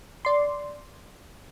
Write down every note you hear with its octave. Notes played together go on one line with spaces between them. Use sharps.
D5 C6